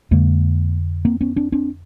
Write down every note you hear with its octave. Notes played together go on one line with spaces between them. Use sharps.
F2 D3 G#3 A#3
A#3 C4
B3 C#4
C4 D4
C4 D4